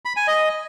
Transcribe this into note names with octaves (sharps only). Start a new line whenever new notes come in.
B5
G#5
D#5